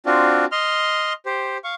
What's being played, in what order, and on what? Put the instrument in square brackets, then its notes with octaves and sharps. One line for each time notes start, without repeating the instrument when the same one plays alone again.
[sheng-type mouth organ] C4 D4 F4 F#4
D#5 C6 F6
G4 C5
F5 C#6